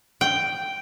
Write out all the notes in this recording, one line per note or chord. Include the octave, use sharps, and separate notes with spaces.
G5